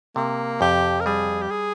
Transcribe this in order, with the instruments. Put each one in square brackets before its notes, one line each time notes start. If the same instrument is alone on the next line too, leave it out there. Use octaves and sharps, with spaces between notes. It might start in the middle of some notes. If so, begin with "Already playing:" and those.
[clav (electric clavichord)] C3 [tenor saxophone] A#3
[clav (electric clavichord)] F2 [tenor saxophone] G4
[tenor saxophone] A#4
[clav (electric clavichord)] G3 [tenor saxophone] G#4
[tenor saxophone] G4
G#4